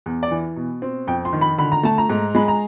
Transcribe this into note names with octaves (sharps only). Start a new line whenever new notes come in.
E2
D5
E3
B2
C4
F2 G5
C6
D#3
B5
D3 B5
A#5
A3 A5
A#5
G#2
G#3 B5
A#5